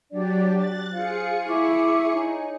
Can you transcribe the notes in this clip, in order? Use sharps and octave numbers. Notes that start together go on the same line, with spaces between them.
F#3 D4 G4 D5
F#6 A6
F4 G#4 C5 F5 C#7
E4 E5 C#6 D6
D#4 C#5 G#5